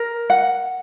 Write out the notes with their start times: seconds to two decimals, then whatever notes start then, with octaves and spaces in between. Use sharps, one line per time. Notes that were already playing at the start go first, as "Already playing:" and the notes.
Already playing: A#4
0.30 F#5